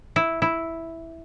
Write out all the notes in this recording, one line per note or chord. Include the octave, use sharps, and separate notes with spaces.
E4
E4